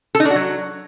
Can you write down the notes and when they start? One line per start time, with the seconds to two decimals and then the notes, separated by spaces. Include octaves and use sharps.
0.15 A4
0.20 D#4
0.25 D4
0.30 F#4
0.36 F#3